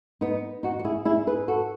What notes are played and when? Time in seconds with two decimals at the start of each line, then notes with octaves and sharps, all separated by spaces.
0.21 B3 D#4
0.63 D#4 F#4
0.79 F#4
0.85 E4 G#4
1.05 E4 G#4
1.27 G#4 B4
1.48 F#4 A4